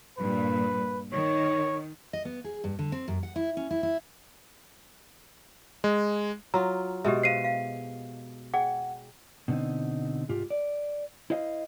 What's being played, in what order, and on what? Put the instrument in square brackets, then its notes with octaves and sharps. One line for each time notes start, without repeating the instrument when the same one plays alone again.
[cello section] G2 A#2 [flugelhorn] B4
[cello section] D#3 [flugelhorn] C#5
[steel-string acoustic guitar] D#5
B3
G#4
G2
D3
C4
F#2
F#5
E4
C#4
E4
E4
[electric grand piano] G#3
[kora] F#3 F4 [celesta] A#5
[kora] B2 G#3 [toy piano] G4 D#5 E5
[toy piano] C5 F5 [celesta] C7 D#7
[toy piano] F5
[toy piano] G#4 D5 G5 [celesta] F#5
[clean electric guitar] B2 D3 A#3 C4 D#4
C2 G#2 F4 G4
D5
E4 C5 D#5 F5